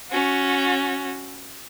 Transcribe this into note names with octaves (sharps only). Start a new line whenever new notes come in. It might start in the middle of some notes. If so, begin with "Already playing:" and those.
C#4 F#4